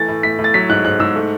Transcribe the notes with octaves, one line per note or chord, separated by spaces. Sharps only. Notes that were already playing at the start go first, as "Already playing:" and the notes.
Already playing: E3 A3 A6
A2
A2 B6
A2
A6
F#3 B6
G#2 F#6
G#2 F#6
G#2 E6
A3